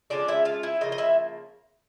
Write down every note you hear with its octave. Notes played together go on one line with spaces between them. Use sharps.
D3 F3 G#3 C#4 D4 D5
E4 E5
F4 F5
E4 E5
C#3 F3 A#3 D#5
D#5
E4 E5